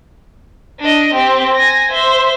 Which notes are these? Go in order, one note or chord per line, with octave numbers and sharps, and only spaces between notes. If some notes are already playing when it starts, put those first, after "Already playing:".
D4 D#5
C4 G4
G#5 A#6
C5 E5